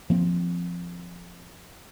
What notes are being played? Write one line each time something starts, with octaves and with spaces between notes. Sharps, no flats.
F3 A#3 C4